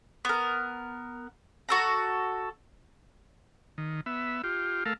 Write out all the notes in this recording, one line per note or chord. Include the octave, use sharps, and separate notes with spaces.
B3 A#4
F#4 A4 A#5
D#3
B3 E5
F4 G4
A3 A4 A#4 F5